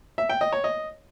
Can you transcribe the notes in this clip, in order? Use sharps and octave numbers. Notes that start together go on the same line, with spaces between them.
E5
G5
D#5
C#5
D#5